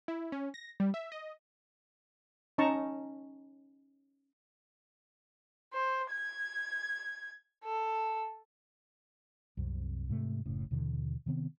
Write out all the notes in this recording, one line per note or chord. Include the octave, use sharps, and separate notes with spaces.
E4
C#4
A#6
G3
E5
D#5
C#4 D#4 A5 A#5 C#6
C5
G#6
A4
C2 F#2 C3
G#2 C3 A3
F#1 A2 C#3
D#2 B2 D3 E3
C3 D#3 B3 C4